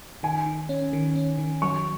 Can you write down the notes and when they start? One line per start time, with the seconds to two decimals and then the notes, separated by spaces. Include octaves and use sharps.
0.23 D#3 G#5
0.46 D#3
0.69 C#4
0.93 D#3
1.16 C#4
1.38 D#3
1.62 F#3 C#6